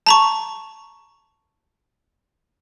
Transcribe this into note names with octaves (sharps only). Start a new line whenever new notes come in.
A5 A#5 C#6